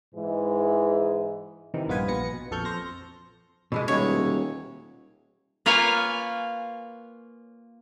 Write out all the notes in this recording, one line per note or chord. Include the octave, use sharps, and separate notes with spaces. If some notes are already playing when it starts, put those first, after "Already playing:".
G#2 E3 G#3
C3 D#3 E3
A#1 G2 B3 F4 B4 G#5
A#1 B3 A#6 C#7
B2
A#1 F2 A4 C#6 F6 G6
F2 C5 A#6
B2 E3 G#3
D#1 C#5
A#3 F4 B4 C#5 F5 G#5